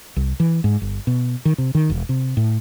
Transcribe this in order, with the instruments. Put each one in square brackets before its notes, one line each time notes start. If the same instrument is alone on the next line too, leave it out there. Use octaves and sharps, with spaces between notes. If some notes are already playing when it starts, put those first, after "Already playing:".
[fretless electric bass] C2
E3
G#2
G1
B2
D#3
C3
D#3
E1
C3
A2